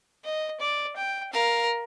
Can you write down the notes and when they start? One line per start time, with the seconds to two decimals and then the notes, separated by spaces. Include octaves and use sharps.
0.24 D#5
0.61 D5
0.96 G5
1.33 A#4 F5